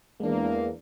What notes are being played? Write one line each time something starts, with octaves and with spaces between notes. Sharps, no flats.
E2 G#3 A#3 D4